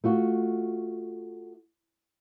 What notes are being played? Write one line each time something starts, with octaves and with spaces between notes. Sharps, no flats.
A3 F4 F#4